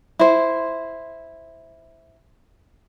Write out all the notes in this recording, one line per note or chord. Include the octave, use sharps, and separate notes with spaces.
E4 C5